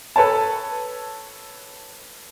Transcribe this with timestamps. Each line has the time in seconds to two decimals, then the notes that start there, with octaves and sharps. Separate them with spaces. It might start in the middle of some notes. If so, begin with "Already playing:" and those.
0.16 A4 B4 C#5 A5